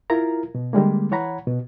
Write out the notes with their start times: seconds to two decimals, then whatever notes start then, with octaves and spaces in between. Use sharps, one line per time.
0.10 E4 F4 A#4 A#5
0.55 B2
0.73 D3 G3 G#3 A#3
1.11 E3 C#5 F#5 A#5 B5
1.47 B2